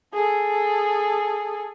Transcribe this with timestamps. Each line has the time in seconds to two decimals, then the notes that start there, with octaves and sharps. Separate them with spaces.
0.14 G#4 A4